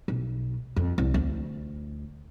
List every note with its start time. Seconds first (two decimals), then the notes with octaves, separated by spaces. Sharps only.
0.08 B1
0.76 F2
0.98 C2
1.14 D2